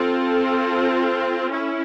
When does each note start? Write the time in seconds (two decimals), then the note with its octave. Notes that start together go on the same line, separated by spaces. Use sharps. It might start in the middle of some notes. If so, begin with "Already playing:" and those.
Already playing: C4 F4 A4
1.51 C#4 E4